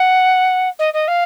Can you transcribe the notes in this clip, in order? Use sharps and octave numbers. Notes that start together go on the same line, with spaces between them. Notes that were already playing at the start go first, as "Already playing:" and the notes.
Already playing: F#5
D#5
D#5
F5